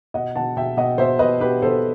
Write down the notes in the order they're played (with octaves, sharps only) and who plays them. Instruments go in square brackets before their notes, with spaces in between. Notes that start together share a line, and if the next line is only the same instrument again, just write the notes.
[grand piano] B2 D#5 F#5
B2 F#5 A5
B2 E5 G5
B2 D#5 F#5
B2 C5 E5
B2 B4 D#5
B2 G4 B4
B2 A4 C5